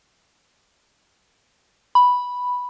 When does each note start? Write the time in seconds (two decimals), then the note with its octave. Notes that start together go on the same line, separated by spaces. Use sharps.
1.95 B5